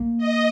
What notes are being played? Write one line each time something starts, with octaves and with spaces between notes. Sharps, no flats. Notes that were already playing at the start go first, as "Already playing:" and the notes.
Already playing: A#3
D#5